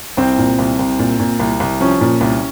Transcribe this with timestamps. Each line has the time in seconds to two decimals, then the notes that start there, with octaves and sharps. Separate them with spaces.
0.17 C2 C4
0.38 A#2
0.59 C2
0.79 C2
0.99 A#2
1.19 A#2
1.40 C2
1.60 C2
1.81 F3 C#4
2.01 A#2
2.21 C2